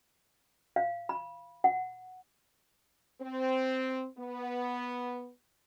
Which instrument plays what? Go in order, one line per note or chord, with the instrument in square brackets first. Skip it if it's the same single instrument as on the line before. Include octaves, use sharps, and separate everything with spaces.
[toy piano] F5
B5
F#5
[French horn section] C4
B3